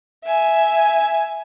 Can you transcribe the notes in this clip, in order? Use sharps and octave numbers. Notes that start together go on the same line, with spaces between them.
E5 G#5